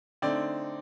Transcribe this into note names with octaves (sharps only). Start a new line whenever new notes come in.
D3 A3 C4 D#4 D5